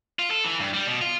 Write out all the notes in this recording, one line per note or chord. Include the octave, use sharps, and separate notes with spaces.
F4
A4
E3
G2
G3
B2
F4